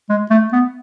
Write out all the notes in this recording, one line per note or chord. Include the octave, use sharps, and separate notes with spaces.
G#3
A3
B3